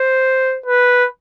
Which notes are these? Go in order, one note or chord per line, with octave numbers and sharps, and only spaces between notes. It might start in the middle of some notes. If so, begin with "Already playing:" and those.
Already playing: C5
B4